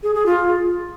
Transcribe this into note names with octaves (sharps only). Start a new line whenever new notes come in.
G#4
G#4
F4